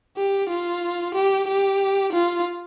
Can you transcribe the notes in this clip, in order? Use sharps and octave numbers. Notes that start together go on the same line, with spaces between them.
G4
F4
G4
G4
F4